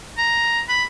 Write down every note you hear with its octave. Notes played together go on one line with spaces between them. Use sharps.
A#5
B5